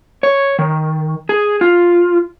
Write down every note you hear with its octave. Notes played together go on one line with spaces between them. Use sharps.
C#5
D#3
G#4
F4